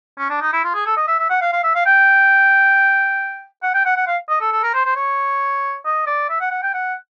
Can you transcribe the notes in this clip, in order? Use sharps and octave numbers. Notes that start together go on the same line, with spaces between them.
C#4
D4
D#4
E4
F4
G#4
A4
D#5
E5
E5
F#5
F5
F5
E5
F5
G5
F#5
G5
F#5
F#5
F5
D#5
A4
A4
A#4
C5
C5
C#5
D#5
D5
E5
F#5
F#5
G5
F#5